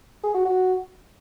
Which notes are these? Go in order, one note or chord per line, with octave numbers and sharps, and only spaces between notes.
G#4
F#4
F#4